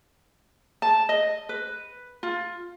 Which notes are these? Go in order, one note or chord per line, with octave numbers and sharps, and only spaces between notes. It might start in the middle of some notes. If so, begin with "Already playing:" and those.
A5
D#5
B4
F4